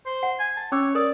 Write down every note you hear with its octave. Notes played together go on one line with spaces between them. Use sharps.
C5
F#5
G#5
A5
C#4 C#5 D6 E6
A#4 D5 D#6